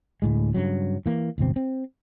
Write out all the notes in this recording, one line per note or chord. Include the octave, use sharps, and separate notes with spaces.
D2 A2 G#3
G2 C#3 F#3
E3 A#3
D1 G1 B2 C4
C4